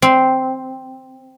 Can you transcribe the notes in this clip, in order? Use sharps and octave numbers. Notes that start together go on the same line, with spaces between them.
C4